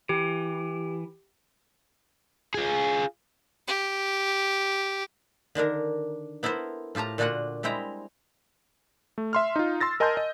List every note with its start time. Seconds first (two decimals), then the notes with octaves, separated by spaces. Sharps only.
0.09 E3 G4
2.54 F4 G#4
3.67 G4
5.55 D3 D#3 D4 A#4
6.43 B3 E4 A4 A#4 C5
6.95 A2 F4 G4 A5 A#5
7.18 A#2 D3 D4 F4 F#4 F#5
7.63 G3 G#3 C4 E4 G5 A#5
9.18 A3
9.33 E5 C6 F6
9.56 D#4 F4
9.81 C6 E6 A6 A#6
10.00 A#4 D#5 G#5 A5 C6 G6
10.17 D#5